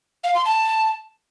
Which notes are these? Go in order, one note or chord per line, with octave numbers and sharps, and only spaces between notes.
F5
C6
A5